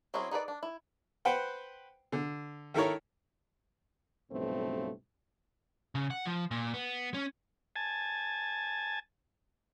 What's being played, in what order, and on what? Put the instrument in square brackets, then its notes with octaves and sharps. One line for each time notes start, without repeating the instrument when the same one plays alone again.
[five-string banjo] F#3 C4 C#4 E4 G#4
D#4 G#4 B4 D5
D4
E4
[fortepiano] B4 C5 F#5 G5
D3
D#3 E4 A4 A#4 C#5
[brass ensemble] B1 G2 C#3 F3 A3 C4
[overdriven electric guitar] C#3
F#5
F3
A#2
B3
C#4
[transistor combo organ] G#5 A5